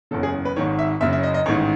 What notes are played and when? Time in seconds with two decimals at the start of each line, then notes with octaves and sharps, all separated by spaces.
0.11 F#1 E2 C#3 A4
0.23 G#4
0.45 B4
0.56 G#1 G#2 D#3 C#5
0.79 E5
1.01 F#1 F#2 C#3 E5
1.13 E5
1.23 D#5
1.34 D#5
1.46 A1 G#2 D#3 C#5